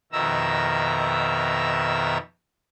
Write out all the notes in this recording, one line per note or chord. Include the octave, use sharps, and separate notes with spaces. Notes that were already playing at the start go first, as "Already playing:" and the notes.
F2 B2 D#3 E5 A#5 E6